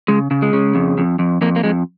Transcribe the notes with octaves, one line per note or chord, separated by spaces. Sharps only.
C#3 G#3
C#3
G#3
C#3
F2
F2
F2
F2 A#3
A#3
F2 G#3